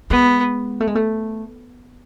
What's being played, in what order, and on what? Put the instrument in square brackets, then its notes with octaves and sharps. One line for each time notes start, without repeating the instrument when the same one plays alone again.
[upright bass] G#3 [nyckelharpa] B3
[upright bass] A3
G#3
A3